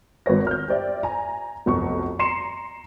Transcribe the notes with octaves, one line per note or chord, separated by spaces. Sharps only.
G#1 B4 C#5 A#6
F6 G6
G4 C5 D5 E5
G#5 A#5
F1 B1 C#6
A#5 C6 C7 C#7 E7